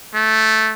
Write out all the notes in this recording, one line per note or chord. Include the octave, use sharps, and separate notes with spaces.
A3